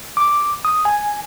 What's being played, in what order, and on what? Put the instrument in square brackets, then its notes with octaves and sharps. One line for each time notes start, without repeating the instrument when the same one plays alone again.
[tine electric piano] D6
D#6
G#5